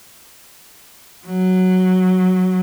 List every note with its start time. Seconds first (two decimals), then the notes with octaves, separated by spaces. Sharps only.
1.27 F#3